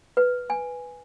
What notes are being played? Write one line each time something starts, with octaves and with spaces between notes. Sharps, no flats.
B4
G#5